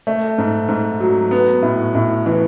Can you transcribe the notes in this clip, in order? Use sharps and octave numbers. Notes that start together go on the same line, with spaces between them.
A3
G#2
G#2
F#3
B3
A2
A2
E3